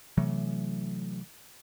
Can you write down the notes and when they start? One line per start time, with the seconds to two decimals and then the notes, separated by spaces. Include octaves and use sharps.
0.17 C3 E3 F#3 A3